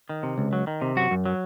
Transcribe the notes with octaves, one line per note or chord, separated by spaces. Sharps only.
D#3
C3
C#2
F#3
D#3
C3
F#2 F#4
F#2
F#3